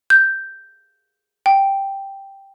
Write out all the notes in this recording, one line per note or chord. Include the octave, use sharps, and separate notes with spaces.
G6
G5